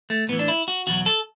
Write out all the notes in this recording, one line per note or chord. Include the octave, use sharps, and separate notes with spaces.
A3
A2 E3 B3
D4
E4
F#4
E2 B2 F#3 F#4
A4